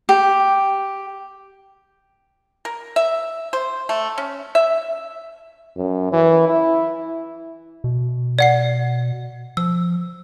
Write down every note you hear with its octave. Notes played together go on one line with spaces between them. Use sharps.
G4
A#4
E5
C5
A3
C#4
E5
F#2
E3
E4
B2
D5 F#5 C7
F3 E6